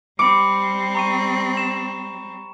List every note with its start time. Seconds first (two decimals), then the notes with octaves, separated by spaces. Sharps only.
0.19 G3 C4 B5 D6 C#7
0.95 A#5 C#6 D#7
1.57 E7